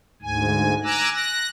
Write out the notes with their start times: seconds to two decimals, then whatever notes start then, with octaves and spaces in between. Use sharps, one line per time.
0.22 D2 G#2 G#5
0.84 G#5 A#5 D6 E6 F#6
1.14 F#6 A#6